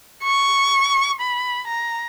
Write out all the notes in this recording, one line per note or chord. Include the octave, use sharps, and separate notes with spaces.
C#6
B5
A#5